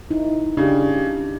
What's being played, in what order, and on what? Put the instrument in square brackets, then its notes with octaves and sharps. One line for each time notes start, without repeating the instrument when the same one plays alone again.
[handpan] D#4 E4
[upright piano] C#3 [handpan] D4 G4